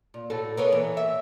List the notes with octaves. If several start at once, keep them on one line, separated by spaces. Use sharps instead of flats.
A#2
A2 F#4 A4
A#3 B3 C#5
E3
E5